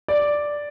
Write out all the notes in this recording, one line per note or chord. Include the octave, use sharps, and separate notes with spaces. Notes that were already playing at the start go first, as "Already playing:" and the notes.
D5